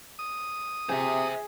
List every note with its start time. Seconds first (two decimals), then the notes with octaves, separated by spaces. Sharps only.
0.19 D#6
0.89 C3 G#4 C5 E5